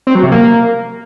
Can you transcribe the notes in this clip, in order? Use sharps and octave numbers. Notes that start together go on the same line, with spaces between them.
C4
F#3
C3
A#3